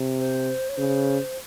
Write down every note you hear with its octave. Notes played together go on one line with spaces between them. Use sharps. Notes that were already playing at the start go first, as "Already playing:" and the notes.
Already playing: C3
C5
C#5
C#3 C5